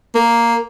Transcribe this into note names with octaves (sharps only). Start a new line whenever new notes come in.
A#3